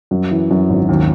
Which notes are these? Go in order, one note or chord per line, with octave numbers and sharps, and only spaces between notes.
F#2
E3
F#2
G#1
D#2